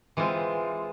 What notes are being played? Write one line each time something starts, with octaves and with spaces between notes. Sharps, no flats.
E3 G#3 C4 F4